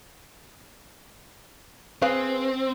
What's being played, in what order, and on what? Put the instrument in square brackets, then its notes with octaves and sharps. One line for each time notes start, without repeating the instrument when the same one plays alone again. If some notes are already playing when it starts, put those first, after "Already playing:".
[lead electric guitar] C4 [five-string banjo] G#4 B4 F5